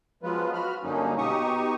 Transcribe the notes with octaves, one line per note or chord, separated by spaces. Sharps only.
F3 F#3 G#3 B3 F4 B4
F#4 B5 F6
G2 D3 F#3 A#3 C#4 D#4
B2 D#4 G4 C#6 D#6